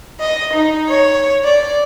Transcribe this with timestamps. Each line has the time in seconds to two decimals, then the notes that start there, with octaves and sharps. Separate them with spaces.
0.21 D#5
0.54 D#4
0.90 C#5
1.44 D5